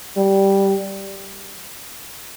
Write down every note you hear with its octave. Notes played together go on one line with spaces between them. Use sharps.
G3